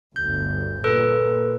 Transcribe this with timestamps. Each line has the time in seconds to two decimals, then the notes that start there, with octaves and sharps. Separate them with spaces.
0.16 G1 D2 G6
0.84 A#2 A4 B4